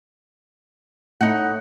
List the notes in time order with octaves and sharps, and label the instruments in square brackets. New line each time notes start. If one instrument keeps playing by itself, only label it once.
[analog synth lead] A2 [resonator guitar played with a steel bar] D#4 F#5